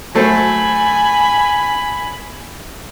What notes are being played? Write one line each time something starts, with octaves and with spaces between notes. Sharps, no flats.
F#3 A3 C5 G#5 B5